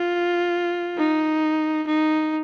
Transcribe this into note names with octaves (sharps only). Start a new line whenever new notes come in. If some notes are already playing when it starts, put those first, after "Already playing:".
Already playing: F4
D#4
D#4